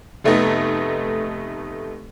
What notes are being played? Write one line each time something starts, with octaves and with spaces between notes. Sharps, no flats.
F1 A3 B3 D#4